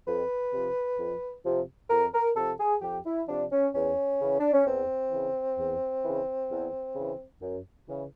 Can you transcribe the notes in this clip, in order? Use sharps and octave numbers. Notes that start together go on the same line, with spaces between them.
F2 B4
C3 F3
F2
C3 F3
F2 A#4
A#4
C3 F3 A4
G#4
F2 G4
E4
C3 F3 D4
C#4
E2 C#4
C#3 E3
D4
C#4
E2 C4
C#3 E3
E2
C#3 E3
E2
C#3 E3
F#2
C#3 E3